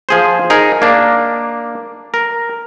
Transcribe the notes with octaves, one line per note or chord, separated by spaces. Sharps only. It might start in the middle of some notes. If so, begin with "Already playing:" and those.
F3 G#4 C5
D#4 G#4 A#4
A#3 D4
A#4